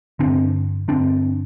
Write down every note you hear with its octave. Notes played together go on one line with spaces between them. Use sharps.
G2 D3 C4 D4
G2 D3 C4 D4